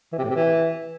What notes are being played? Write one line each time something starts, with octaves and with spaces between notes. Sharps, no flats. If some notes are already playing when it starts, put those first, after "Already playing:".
E3
C3
A2
C3
E3